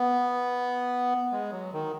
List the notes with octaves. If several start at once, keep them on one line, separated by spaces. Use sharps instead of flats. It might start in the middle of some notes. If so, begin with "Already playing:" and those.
Already playing: B3
G#3
F#3
D#3